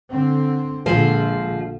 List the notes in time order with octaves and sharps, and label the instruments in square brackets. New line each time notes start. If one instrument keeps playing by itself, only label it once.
[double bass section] D3 C4
[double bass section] A#1 D3 [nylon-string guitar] F3 G#3